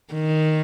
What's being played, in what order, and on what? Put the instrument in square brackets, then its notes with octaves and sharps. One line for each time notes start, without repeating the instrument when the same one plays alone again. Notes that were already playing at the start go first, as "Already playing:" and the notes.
[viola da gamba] D#3